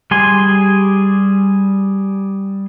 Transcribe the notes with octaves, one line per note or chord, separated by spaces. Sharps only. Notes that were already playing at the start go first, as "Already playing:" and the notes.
G3 G#4 G#5 C6